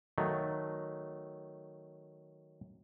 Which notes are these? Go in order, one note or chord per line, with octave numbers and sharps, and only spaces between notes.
D#3 F#3 A3